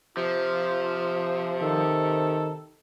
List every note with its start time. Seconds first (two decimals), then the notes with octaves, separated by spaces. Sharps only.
0.17 C3 F3 F4
1.62 D#3 A4